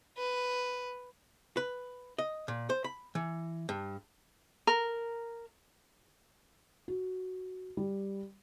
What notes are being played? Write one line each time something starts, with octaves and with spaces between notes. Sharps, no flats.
B4
B4
D#5
A#2
C5
B5
E3
G2
A#4
F#4
G3